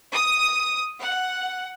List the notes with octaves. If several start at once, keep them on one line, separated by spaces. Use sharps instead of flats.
D#6
F#5